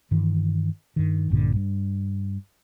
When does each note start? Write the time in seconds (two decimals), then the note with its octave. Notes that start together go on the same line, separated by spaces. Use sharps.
0.11 G2 D#3 E3
0.96 G2 D#3
1.30 A#1 G2 A#2 D3
1.56 G2